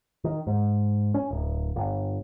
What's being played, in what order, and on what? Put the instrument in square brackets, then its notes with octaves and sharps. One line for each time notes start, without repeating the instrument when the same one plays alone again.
[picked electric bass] D#3
G#2
C#4
D1
G1